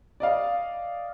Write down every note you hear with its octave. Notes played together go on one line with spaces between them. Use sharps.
D5 D#5 F5